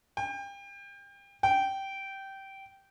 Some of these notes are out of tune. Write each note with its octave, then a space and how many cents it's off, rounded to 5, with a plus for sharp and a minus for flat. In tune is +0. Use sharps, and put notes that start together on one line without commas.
G5 +30
G5 -15